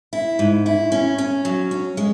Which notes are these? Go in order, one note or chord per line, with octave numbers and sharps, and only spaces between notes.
E4
G#2
E4
C#4
C#4
F#3
C#4
G#3